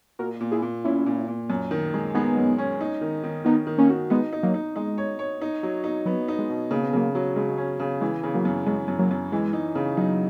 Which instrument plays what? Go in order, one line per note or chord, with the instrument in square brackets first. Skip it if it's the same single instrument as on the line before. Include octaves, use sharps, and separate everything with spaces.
[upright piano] A#2 [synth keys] F#4 A#4
[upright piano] A#2
[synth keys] E4 G#4
[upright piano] A#2
[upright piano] A#2 [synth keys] C#4 E4
[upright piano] A#2
A#2
F#2
D#3
G#3
[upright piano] G#3 [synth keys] B3 D#4
[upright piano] F#2
C#4
D#4
D#3
D#3
[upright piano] D#3 [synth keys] B3 D#4
[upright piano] D#3
[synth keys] A#3 C#4
[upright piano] F#4
[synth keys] G#3 B3 [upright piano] D#4
[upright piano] D#4
[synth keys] F#3 A#3
[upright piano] D#4
[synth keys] G#3 [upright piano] D#4
[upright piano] C#5
C#5
D#4
F#3
D#4
[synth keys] F#3 [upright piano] B3
[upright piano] D#4
[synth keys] G#3
[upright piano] B2
[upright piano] C#3 [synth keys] A#3
[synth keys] B3
[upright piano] C#3 [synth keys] F#3 A#3
[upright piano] F#3
[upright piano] C#3 [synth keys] G#3
[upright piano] C#4
C#3
[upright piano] E3 [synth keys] G#3
[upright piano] C#3
[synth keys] F#3 A#3
[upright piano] F#2
[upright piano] F#2 [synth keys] G#3
[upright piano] F#2
[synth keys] F#3 A#3
[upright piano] F#2
[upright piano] E3 [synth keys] G#3
[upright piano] D#4
C#3
[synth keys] F#3 [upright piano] D#4